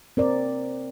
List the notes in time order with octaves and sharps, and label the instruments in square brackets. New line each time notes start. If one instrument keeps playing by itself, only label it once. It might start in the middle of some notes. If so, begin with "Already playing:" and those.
[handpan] C4 A#4 D5